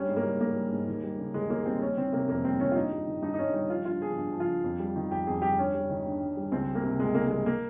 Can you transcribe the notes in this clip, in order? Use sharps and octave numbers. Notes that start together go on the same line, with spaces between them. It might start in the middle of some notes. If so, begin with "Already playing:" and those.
Already playing: G2 G3 C#4
G#2
A#3
G3
G#2 A#3
G3
G#2
D#2
G3
C#3
D#2 G#3
D#2 A#3
G3 C4
G3 C#4
D#3 C4
C3 A#3
F2 A#3
G3 C4
D#3 C#4
F4
G2 D#4
G3
D#3
G2 D#4
D#4
G2 C#4
G3 D#4
F3 F4
G2 F4
F3 G#4
G2
F3
F4
G2
F2
G3
D#3
F2 G4
F2 G#4
G3 G4
G2 C#4
G3
D#3
G2
G2
G3
C#2 C4
G3
A#3
C3
C#2 G#3
C#2 A#3
A#3
G3 G#3
A#3